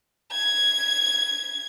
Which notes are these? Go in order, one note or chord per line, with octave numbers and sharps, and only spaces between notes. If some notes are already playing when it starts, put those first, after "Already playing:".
G#6